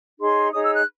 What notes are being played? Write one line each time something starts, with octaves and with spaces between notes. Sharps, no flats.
D#4 G#4 C#5 C6
D#4 G#4 C#5 D#6
E6
F#6